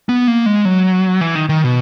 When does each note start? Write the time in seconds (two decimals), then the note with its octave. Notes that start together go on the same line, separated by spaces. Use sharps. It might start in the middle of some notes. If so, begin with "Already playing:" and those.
0.09 B3
0.27 A#3
0.46 G#3
0.65 F#3
1.21 E3
1.35 D#3
1.49 D#3
1.64 B2